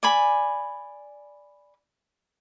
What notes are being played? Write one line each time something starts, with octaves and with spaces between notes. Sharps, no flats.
D5 G#5 B5